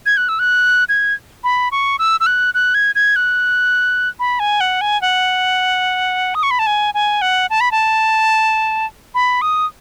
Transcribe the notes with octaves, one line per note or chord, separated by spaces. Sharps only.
G#6
F#6
E6
F#6
G#6
B5
C#6
E6
E6
F#6
F#6
G#6
G#6
F#6
B5
G#5
F#5
G#5
F#5
D#6
C#6
B5
A5
G#5
G#5
F#5
A5
B5
A5
B5
D#6